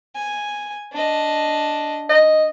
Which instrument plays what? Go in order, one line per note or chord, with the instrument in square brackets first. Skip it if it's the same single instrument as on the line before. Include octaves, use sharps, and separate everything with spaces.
[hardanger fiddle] G#5
D4 D#5
[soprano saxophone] D#5